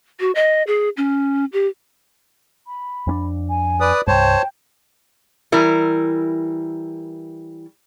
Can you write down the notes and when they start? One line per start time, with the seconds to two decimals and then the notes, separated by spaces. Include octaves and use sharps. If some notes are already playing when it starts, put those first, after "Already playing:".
0.20 F#4
0.35 D#5
0.67 G#4
0.97 C#4
1.53 G4
2.66 B5
3.07 F2 C#4 D4
3.49 G#5
3.80 B4 D5 D#6
4.08 C2 G2 C5 C#5 G5 A5
5.52 E3 G3 E4 A#4